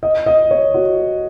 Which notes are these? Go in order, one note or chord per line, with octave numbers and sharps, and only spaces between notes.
D#5
D#5
C#5
F#4